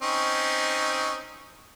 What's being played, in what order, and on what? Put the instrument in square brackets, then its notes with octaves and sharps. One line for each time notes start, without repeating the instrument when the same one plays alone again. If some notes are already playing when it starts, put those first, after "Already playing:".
[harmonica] C4 C#4 D#4